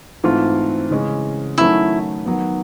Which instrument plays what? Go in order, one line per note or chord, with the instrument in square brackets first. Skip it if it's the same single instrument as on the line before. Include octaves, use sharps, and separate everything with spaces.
[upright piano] G#2 E3 A3 C4 F4
C#3 E3 G#3 C#4
[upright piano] D#3 F#3 A3 C#4 [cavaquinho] E4
[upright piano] D#3 F#3 B3